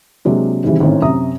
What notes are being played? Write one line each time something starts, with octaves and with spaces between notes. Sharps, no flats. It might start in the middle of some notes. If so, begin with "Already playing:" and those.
C3 F#3 G#3 A#3 D4
G#1 G#2 C3 E3 G3
G#1 A2 D#3 C4 C#4
F#2 C3 E5 A#5 D#6